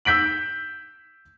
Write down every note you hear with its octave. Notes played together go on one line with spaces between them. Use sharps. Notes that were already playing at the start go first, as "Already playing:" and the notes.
E6 G6 B6 D7 F#7